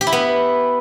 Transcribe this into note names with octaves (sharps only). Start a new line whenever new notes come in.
G4
E4
B3